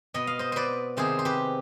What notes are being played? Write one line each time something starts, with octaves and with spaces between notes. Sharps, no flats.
B2 B3 D#5
F5
C5 D#5
B4 C5 D5
C3 D#3 B3 G#4 C5
C5
G4 B4